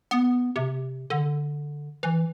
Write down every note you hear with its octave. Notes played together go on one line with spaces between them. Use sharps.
B3
C3
D3
E3